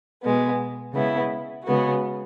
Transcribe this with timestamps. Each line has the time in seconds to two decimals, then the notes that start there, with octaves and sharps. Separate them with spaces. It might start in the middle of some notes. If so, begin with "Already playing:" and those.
0.23 B2 G#3 B3
0.93 C#3 G#3 B3 E4
1.64 C#3 G#3 B3 F#4